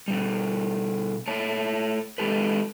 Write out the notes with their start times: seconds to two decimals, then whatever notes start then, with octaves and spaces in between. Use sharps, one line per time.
0.08 B2 G3
1.28 A3 C#5 A5
2.18 G#3 G4 A4 B4